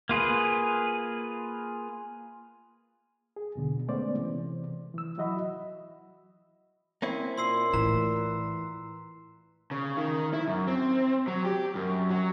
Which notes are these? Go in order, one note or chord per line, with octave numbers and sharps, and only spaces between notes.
A#3 F4 G#4 B4
G#4
E2 B2 D3
G#3 A3 B3 C#4 C5 D5
C3 E3
E3 E6
F#3 E4 F#4 D#5 E5 B5
A#3 C4 C#4 E4
A#2 C6 E6 C7
A2 E3 A#5
C#3
D#3
E4
F#2
C4
F#3
G4
F#2
F#3